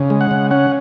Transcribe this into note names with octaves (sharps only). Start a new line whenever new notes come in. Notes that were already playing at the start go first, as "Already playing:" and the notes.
Already playing: C#3
G#3
F#5
C#3
C#4 F#5